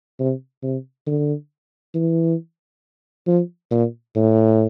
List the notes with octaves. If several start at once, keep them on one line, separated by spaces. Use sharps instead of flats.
C3
C3
D3
E3
F3
A#2
A2